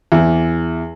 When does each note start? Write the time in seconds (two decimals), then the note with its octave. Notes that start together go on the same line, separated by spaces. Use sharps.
0.12 E2